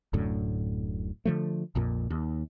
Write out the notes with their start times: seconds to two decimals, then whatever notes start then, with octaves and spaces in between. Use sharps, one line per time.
0.13 D1 F#2 A2 D3
1.25 D3 F3 A3
1.75 A#1 F2 A#2
2.10 D#2